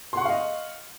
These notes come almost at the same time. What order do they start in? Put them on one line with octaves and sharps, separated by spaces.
C6 F#5 C#6 F5 D#5